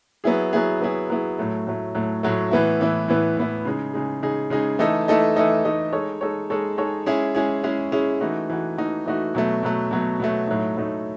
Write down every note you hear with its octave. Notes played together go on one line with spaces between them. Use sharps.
F#3 B3 E4 G#4
F#3 B3 E4 G#4
F#3 B3 E4 G#4
F#3 B3 E4 G#4
A2 F#3 A3
A2 F#3 A3
A2 F#3 A3
A2 F#3 A3
A2 E3 B3 E4
A2 E3 B3 E4
A2 E3 B3 E4
A2 E3 B3 E4
C#3 G#3 D#4 G#4
C#3 G#3 D#4 G#4
C#3 G#3 D#4 G#4
C#3 G#3 D#4 G#4
E3 A3 D#4 A4 D#5
E3 A3 D#4 A4 D#5
E3 A3 D#4 A4 D#5
E3 A3 D#4 A4 D#5
G#3 D#4 A4 C#5
G#3 D#4 A4 C#5
G#3 D#4 A4 C#5
G#3 D#4 A4 C#5
G#3 C#4 E4 G#4
G#3 C#4 E4 G#4
G#3 C#4 E4 G#4
G#3 C#4 E4 G#4
E3 A3 D#4 F#4
E3 A3 D#4 F#4
E3 A3 D#4 F#4
E3 A3 D#4 F#4
B2 F#3 A3
B2 F#3 A3
B2 F#3 A3
B2 F#3 A3
A2 F#3 A3 D#4
A2 F#3 A3 D#4